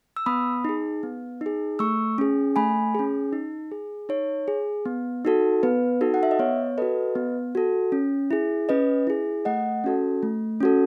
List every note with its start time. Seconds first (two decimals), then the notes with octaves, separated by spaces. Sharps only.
0.16 E6
0.26 B3 B5 D#6
0.65 D#4 G#4
1.03 B3
1.41 D#4 G#4
1.79 A3 C#6 E6
2.18 C#4 G#4
2.56 A3 G#5 B5
2.95 C#4 G#4
3.33 D#4
3.72 G#4
4.09 D#4 C#5
4.48 G#4
4.86 B3
5.25 D#4 F#4 A4
5.63 B3 B4
6.01 D#4 F#4 A4
6.14 F#5
6.23 E5
6.31 D#5
6.39 B3 C#5
6.78 F#4 A4 B4 D#5
7.15 B3
7.55 F#4 A4
7.92 C#4
8.31 E4 G#4
8.69 C#4 B4 D#5
9.07 E4 G#4
9.45 A3 D#5 F#5
9.84 C#4 F#4 A4
10.23 A3
10.60 C#4 F#4 A4